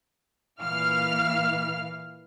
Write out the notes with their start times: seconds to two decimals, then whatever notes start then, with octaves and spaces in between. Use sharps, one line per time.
0.60 A#2 E3 F5 F6